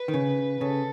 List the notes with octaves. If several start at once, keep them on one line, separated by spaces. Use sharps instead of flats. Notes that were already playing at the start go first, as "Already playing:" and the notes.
Already playing: B4
D#3
C#3
C#3 A4